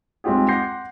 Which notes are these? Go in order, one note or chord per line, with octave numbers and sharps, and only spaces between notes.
G#3 C4 D#4 F4 G4 G#4
F#5 C6 D6 G6 A#6 C7